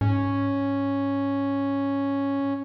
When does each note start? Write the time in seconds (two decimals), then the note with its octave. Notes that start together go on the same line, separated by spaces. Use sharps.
0.01 G#2 C#4